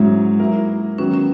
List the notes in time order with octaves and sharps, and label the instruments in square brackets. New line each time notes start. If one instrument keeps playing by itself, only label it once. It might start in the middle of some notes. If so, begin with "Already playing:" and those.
Already playing: [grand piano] G#2 F#3 C#4 E4 [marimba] G#3
[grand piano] F#3 A#3 E4 A#4
[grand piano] D#3 F#3 B3 [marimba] C#4
[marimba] C#4